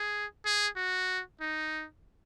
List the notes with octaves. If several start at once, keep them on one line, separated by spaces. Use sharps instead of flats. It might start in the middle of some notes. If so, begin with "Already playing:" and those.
Already playing: G#4
G#4
F#4
D#4